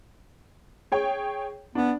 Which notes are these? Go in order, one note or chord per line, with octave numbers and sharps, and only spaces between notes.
G#4 C#5 G5
B3 D4